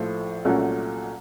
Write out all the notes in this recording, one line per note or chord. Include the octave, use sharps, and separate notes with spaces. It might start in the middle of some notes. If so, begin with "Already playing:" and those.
Already playing: A#1 A2 F3 A3
C2 A#2 F#3 A3 C#4